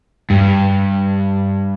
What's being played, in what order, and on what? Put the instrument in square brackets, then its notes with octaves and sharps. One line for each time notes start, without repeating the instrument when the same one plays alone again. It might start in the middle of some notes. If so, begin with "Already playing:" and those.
[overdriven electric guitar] G2